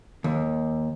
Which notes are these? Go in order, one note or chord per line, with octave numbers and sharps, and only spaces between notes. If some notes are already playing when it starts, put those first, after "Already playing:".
D#2